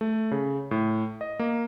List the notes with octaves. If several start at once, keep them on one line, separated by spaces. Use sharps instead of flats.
A3
C#3
A2
D#5
A#3